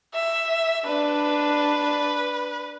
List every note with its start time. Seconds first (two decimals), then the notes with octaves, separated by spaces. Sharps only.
0.15 E5
0.88 D4 B4